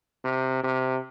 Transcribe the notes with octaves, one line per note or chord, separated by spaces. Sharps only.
C3
C3